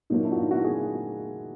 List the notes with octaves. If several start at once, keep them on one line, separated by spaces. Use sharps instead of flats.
A#2 F#3 A#3 D#4
D4 E4
F#4
D#4 F4
E4 F#4
F#4 G#4